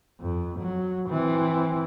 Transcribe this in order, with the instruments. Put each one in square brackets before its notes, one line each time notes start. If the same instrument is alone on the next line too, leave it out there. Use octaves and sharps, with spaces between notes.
[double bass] F2
F#3
E3 C4